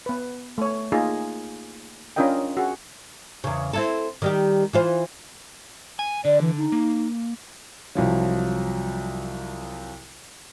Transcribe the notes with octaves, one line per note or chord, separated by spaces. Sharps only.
B3 B4
A3 C#5
A#3 D#4 F4 G#4 A#5
C#4 D4 F4 A#4 D#5 G5
F#4 G#4
E2 C#3
C4 E4 A4
D#3 G3 G4
E3 F4 C5
G#5
D3 D5
E3
D#4
A#3
C2 F3 F#3